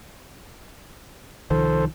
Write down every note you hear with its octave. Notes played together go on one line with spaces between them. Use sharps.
C2 D#3 F3 A4 C5